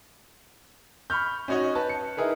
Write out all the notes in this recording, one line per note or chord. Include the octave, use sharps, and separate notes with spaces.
B5 C#6 F6 G6
C#4 D#4 F#4 C#5 D#5
B4 A5
C#7
D#4 E4 G#4 A#4 B4